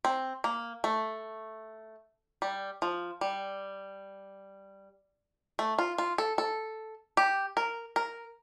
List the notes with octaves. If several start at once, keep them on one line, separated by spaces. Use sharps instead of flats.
C4
A#3
A3
G3
F3
G3
A3
F4
F4
A4
A4
G4
A#4
A#4